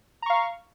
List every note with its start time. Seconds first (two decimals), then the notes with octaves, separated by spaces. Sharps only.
0.22 A#5
0.26 C#6
0.30 F5